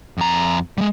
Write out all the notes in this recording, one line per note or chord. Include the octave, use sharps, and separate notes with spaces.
F2 A#5
G3 G#3